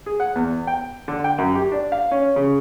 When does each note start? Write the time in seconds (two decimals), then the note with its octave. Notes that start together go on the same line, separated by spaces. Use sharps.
0.06 G#4
0.20 F#5
0.35 E2
0.67 G5
1.08 D3
1.24 G5
1.38 F#2
1.55 G4
1.72 D4
1.92 F5
2.11 C#4
2.36 C#3